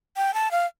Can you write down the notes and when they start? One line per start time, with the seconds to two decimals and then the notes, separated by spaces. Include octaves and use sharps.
0.17 G5
0.34 A5
0.51 F5